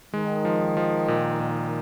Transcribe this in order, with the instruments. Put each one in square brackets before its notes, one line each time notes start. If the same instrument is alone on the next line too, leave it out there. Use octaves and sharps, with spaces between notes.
[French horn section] D#3 [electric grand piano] G#3
[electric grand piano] F3
F3
A#2
A#2